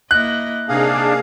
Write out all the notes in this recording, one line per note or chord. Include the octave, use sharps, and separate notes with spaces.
A#3 E4 D#5 F#6
C3 A#3 D4 D#4 G#4 F5